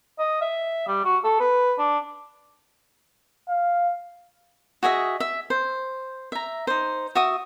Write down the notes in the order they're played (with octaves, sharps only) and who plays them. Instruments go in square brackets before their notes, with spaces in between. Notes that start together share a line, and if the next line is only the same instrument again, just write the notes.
[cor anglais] D#5
E5
G3
F#4
A4
B4
D4
[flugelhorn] F5
[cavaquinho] F#4 G#4 D#5 E5
E5
C5
E5 A#5
D#4 C5
F#4 E5 D#6